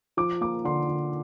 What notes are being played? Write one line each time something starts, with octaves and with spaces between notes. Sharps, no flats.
F3 D6
A#3 D6
D3 C6
D3